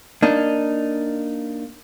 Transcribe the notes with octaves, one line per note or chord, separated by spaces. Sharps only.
A#3 D4 D#4